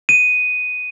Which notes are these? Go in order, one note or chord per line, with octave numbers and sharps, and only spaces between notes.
D#7